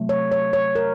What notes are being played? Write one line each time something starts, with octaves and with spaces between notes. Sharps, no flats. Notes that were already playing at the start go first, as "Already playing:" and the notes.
Already playing: C3 F#3 A3
C#5
C#5
C#5
A#4